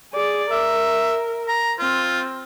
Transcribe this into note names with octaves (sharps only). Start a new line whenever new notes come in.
G#4 D5
A#4 E5
A#5
C4 F4